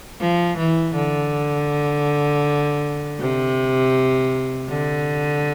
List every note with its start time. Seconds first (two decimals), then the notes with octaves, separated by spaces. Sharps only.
0.20 F3
0.58 E3
0.95 D3
3.20 C3
4.69 D3